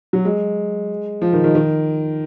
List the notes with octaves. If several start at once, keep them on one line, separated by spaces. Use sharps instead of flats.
F#3
G#3
F3
D#3
D#3
D#3